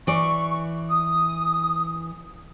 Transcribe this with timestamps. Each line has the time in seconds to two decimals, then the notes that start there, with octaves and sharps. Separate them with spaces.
0.07 E3 D5 C#6
0.90 D#6